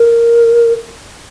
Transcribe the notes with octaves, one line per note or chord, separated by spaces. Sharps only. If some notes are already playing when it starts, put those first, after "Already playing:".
Already playing: A#4